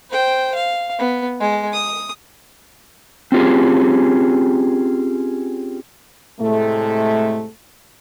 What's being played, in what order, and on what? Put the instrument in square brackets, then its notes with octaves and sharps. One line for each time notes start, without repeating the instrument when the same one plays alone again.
[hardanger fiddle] C5 G5
F5
B3
G#3
D#6
[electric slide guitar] C4 C#4 F4 G4 G#4
[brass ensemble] A2 C3 G#3 A3